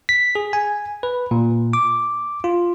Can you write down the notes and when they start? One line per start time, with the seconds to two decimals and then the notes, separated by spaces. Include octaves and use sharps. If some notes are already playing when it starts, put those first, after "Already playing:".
0.09 B6
0.35 G#4
0.53 G#5
1.03 B4
1.31 A#2
1.73 D6
2.44 F4